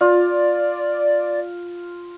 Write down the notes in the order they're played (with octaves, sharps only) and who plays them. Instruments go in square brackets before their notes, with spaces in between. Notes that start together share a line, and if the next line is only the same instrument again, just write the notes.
[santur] F4 [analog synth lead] D5